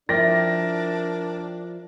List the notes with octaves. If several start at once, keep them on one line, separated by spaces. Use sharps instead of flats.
F3 D4 E4 A#4 D5 G5 A#6